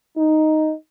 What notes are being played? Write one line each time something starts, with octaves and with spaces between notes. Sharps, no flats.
D#4